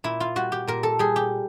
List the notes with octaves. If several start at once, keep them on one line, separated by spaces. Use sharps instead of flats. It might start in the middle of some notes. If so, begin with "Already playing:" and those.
A#2 E4
F4
G3 F#4
G4
A#2 A#4
A4
G3 G#4
G4